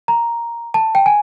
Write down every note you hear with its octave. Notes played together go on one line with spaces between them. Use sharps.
A#5
A5
G5
G#5